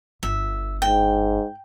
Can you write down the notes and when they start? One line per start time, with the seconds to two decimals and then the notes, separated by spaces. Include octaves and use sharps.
0.23 G1 E5
0.82 G#2 G5